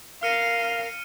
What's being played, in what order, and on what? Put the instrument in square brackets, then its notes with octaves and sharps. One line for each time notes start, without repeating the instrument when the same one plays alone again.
[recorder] A#4 [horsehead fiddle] F5 [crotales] F6 C#7 D#7